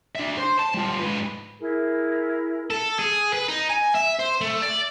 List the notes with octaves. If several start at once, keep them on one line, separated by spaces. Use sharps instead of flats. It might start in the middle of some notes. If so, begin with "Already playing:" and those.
D4 E5
C5 C6
A5
G3 F4
G#2 B4
E4 G#4 A#4
A4
G#4
B4
D#4
G#5
E5
C5
A3
D5